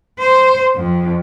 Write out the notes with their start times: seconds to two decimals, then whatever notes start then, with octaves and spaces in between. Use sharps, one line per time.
0.19 C5
0.76 F2